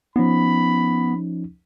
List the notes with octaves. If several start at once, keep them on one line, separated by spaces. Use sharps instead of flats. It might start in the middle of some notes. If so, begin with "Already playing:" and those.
F3 B3 C#4 D#4 B5